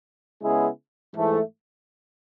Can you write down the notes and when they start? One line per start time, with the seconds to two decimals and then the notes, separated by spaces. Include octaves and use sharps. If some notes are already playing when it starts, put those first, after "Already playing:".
0.42 C#3 G#3 B3 E4 G#4
1.14 G#2 E3 A3